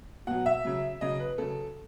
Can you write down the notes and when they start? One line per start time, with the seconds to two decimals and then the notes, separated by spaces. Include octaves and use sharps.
0.27 B2 F#3 F#5
0.46 E5
0.65 C#3 F#3
1.01 C#3 F#3 D#5
1.20 B4
1.38 C#3 F#3 A4